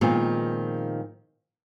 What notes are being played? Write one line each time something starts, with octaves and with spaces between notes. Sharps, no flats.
A#2 D#3 F3 G#3 B3 C4